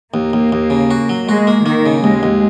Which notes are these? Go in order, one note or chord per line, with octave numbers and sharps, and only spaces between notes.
D#2 A#3
D#2
D#2
C#3
F#4
F#3
G#3 F#4
A#3
D#3 A#3
C#3
D#2 G#3
D#2